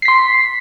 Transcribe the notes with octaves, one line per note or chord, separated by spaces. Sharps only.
C6 B6 C7